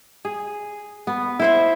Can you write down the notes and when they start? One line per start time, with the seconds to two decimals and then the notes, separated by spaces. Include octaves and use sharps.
0.25 G#4
1.07 B3
1.39 E4 C5 E5